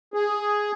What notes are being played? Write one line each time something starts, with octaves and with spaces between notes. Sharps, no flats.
G#4